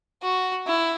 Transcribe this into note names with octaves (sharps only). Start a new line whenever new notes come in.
F#4
E4